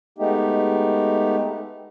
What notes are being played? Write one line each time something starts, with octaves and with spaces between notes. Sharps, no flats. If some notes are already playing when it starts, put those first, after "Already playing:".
G#3 A3 B3 D#4 G4